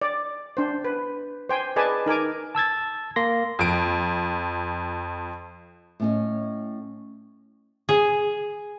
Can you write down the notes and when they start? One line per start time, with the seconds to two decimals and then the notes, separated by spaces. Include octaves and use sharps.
0.02 D5
0.57 D4 C5
0.85 B4
1.49 C5 G5 G#5
1.76 G#4 B4 D5 D#5 G#5 A5
2.06 D#4 A#4 G#5 D6
2.55 A5 E6 G#6 A6
3.16 A#3 C6 A#6
3.59 F2 D7
6.00 A2 C#4 D#5
7.89 G#4